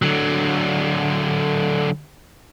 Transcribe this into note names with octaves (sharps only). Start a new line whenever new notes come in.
D3 F#3